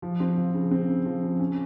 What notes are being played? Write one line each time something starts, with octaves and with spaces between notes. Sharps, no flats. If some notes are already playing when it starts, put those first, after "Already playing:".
F3
C4
F3
C#3
C4
C#3
F3
C#3
C#4